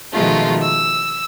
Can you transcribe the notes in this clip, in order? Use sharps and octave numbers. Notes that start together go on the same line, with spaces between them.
B2 D#3 F3 G#3 A3 F4
E6